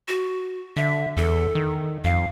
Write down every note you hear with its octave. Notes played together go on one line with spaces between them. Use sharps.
F#4
D3 E5
E2 A4
D#3
F2 F5